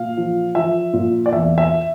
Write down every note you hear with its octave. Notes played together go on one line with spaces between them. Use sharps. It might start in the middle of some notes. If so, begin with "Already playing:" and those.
Already playing: A#2 F5
F3
F3 E5
A#2
D5
E2 E5
E5